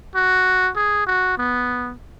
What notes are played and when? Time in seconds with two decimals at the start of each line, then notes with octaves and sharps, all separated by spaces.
0.15 F#4
0.76 G#4
1.07 F#4
1.38 B3